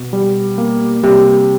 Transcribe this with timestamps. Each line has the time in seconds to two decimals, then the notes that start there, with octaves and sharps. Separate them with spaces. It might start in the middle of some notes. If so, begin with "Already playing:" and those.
Already playing: B2
0.13 G3
0.58 A#3
1.03 C3 G3